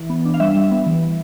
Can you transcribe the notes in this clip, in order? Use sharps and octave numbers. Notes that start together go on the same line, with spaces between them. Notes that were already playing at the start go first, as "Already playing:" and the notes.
Already playing: E3
B3
D4
F5
G3 E5
G3
B3
E3
E3